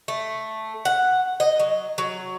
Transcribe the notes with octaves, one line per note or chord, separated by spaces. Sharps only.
A3
F#5
D#5
F#3
F#3